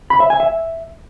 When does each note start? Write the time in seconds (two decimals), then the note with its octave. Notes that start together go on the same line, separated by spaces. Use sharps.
0.10 B5
0.20 E5
0.30 G#5
0.40 E5